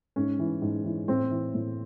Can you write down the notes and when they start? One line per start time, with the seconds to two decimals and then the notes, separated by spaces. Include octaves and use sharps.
0.16 G#2 C#4
0.39 E3
0.62 G#2
0.85 E3
1.08 A2 C4
1.30 E3
1.54 A2